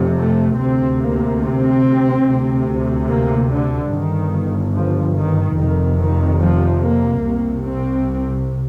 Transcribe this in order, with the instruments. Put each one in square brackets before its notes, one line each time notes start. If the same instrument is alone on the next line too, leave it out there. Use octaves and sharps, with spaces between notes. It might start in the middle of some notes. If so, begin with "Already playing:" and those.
Already playing: [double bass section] F1 F2 C3
A3
D2 C3 C4
A#3
C4
D2 C3
A#3
D3
G1 G2 D#3
F3
D#3
F1 F2 C3 D#3
D#3
F3
A#3
C2 C3
C4